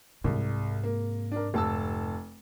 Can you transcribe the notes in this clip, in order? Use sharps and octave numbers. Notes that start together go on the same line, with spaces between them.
C2 G#2 C3
A#3
D4 A#4
F1 A5 E6